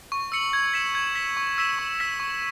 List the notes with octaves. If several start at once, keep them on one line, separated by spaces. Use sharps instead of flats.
C#6
E6 C#7 F#7
G#6
B6 E7
G#6
B6 E7
C#6
E6 B6 E7
C#6
E6 B6 E7
C#6